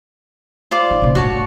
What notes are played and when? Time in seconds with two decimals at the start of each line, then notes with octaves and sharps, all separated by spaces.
0.71 F4 C5 D5
0.90 D#3
1.02 A#2 C#3
1.15 G1 A2 F#4 C#5 A5